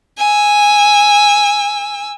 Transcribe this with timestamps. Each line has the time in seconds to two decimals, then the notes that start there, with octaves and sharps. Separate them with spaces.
0.18 G#5 E6